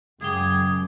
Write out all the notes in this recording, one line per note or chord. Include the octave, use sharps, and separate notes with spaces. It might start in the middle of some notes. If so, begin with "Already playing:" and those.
C#2 F#2 G4 G#4